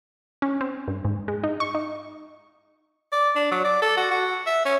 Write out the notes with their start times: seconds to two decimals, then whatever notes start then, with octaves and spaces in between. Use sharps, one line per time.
0.42 C#4
0.61 C4
0.88 G2
1.05 G#2
1.28 G#3
1.43 D#4
1.60 C#6
1.75 D#4
3.12 D5
3.36 D4
3.51 F#3
3.64 D5
3.82 A4
3.97 F#4
4.11 F#4
4.47 E5
4.66 C#4